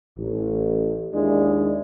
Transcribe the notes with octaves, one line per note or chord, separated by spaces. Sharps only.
A1
D#2 G#3 D4 E4